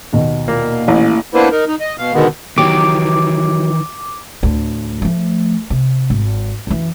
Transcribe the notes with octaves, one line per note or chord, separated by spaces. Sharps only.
D#2 B2
A#2 A#3
A1
A#3 B3 D4 E4 B4 C5
D#4 A#4
D#4
D#5
B2 F5
B2 D3 D#3 G#3 B3
D#3 E3 F#3 B3 G4 D6
D2 A2
F3 A3
C3
G#1
F#2 E3